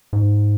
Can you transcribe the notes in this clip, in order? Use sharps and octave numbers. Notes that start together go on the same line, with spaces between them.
G#2